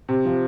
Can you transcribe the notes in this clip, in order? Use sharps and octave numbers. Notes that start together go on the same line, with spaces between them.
C3
F3